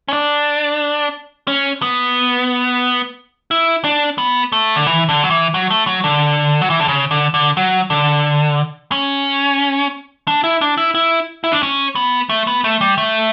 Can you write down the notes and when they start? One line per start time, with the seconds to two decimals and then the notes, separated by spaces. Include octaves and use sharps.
0.08 C#4
0.13 D4
1.48 C#4
1.82 B3
3.51 E4
3.84 D4
4.18 B3
4.52 A3
4.76 D3
4.87 E3
5.09 D3
5.23 F#3
5.30 E3
5.54 F#3
5.70 A3
5.87 F#3
6.04 D3
6.61 F#3
6.70 E3
6.80 D3
6.88 C#3
7.11 D3
7.34 D3
7.57 F#3
7.90 D3
8.92 C#4
10.28 D4
10.44 E4
10.61 D4
10.78 E4
10.95 E4
11.44 E4
11.52 D4
11.63 C#4
11.95 B3
12.29 A3
12.47 B3
12.64 A3
12.81 G3
12.98 A3